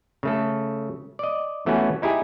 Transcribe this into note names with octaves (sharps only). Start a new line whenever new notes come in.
C#3 A3 A4
D5 D#5
E3 A3 B3 C#4 F#4 B4
D#4 E4 G4 G#4